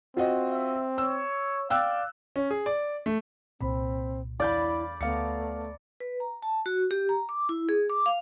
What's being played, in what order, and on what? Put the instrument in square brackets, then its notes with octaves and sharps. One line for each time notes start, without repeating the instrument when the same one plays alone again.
[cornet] C4 [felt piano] F4 F#4 D#5
[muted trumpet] E5
[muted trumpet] C#5 [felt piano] E6
[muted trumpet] D5 [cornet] F5 [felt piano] G5 E6 F#6
[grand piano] C#4
G#4
D5
A3
[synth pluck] C2 A#2 [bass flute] C4 [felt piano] B5
[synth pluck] E2 A6 [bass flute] E4 [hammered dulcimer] D5 B5 [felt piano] F5 G6
[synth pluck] D2 A5 A#5 [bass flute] A3 [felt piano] B3 F5 C#7
[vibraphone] B4
A#5
A5
F#4
G4
A#5
D6
E4
G#4
D6
F5